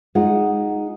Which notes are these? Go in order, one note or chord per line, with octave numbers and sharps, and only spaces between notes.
G#3 D#4 F4 G#4 F#5